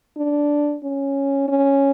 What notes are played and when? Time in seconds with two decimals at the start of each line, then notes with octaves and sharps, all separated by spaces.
0.17 D4
0.84 C#4
1.48 C#4